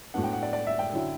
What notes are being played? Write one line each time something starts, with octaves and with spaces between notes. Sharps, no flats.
A2 F#3 B3 D4 F#5
G5
F#5
D5
D5
E5
G5
D3 F#3 C#4 E4